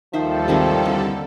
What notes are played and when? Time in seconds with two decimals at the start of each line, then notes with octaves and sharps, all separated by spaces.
0.13 D#2 D#3 F3 G3 A4 C5 E5
0.48 G#1 C3 D#3 C4
0.86 C2 D3 A#3